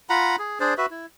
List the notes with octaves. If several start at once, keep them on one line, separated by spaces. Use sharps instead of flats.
F4 F#5 A#5 B5
G#4
D4 G#4 C5 D5
F#4 B4 E5
E4